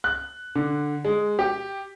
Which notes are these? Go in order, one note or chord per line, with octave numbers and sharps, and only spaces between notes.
F#6
D3
G#3
G4